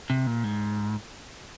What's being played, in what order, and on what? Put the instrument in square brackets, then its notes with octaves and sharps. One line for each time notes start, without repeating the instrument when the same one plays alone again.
[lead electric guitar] C3
A#2
G#2